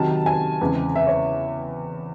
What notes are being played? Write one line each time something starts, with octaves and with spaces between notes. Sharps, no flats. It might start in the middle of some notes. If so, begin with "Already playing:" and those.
Already playing: C3 D#3 F#3 A5
G#5
E2 C#3 G#3 C4
E5
C#5